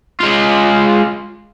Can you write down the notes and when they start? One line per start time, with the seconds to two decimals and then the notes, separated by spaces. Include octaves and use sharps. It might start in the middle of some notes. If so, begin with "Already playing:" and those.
0.21 G#3 F4